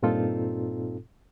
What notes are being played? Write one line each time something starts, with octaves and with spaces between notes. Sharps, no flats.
G2 A#2 C4 D#4 F4 A4